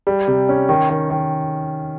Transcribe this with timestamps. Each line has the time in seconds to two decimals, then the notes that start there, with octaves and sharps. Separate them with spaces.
0.07 G3
0.28 C3
0.49 C#4
0.69 D#3
0.89 D#3
1.10 D#3